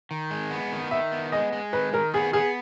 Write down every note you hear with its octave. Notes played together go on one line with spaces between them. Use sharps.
D#3
G#3
B3
D#3
D#3 E5
B3
G#3 D#5
G#3
D#3 B4
D#3 A#4
B3 G#4
B3 G#4